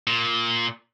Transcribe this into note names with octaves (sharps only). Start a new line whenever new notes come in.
A#2